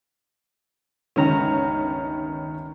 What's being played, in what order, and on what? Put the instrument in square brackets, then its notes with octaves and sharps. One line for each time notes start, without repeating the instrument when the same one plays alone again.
[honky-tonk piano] G1 D#3 C#4 [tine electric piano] C#2 A#5